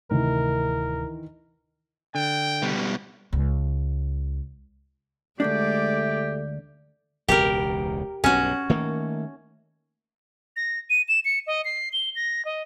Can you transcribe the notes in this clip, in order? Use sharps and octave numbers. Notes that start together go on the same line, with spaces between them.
D1 C3 D#3 E3 A3 A#4
D3 G5
B2 G3
C#2
D2 G2 G#3 A3 D4 G4 D5
E1 C#2 B2 G4 A#4
B1 G2 C#4 F#4
D#3 A3 A#3
A#6
D#7
E7
C#7
D#5
C7
G7
A#6
D#5